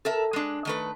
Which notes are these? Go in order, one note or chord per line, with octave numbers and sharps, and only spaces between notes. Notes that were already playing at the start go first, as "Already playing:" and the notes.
A4 A#4 E5
G#3 D4
D#3 A3 B4